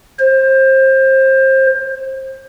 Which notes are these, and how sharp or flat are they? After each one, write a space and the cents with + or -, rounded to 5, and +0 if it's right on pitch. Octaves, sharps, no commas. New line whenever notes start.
C5 +25